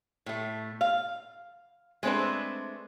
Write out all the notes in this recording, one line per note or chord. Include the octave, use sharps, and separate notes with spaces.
A2 A3
F5
G#3 A3 C4 D4 B4